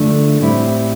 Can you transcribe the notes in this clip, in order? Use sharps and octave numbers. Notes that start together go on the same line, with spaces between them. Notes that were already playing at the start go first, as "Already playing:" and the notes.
Already playing: G2 D3 F3 A3 D4
A2 G3 C4 E4